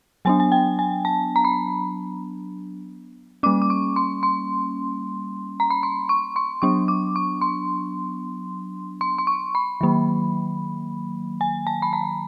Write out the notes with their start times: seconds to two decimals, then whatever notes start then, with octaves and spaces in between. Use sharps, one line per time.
0.25 F#3 B3 D4 G#5
0.40 G#5
0.52 G5
0.79 G#5
1.05 A5
1.36 A#5
1.45 B5
3.43 G3 A#3 C#4 D6
3.62 D6
3.70 C#6
3.96 C6
4.23 C6
5.60 A#5
5.70 B5
5.83 C6
6.09 C#6
6.36 C6
6.62 F#3 B3 D4 C#6
6.88 D6
7.16 C#6
7.41 C6
9.01 C6
9.18 C6
9.27 C#6
9.55 B5
9.81 D#3 F#3 A#3
11.41 G#5
11.67 A5
11.82 B5
11.93 A#5